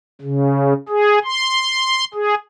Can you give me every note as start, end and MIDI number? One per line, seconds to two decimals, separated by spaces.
0.22 0.74 49
0.89 1.19 68
1.24 2.04 84
2.14 2.35 68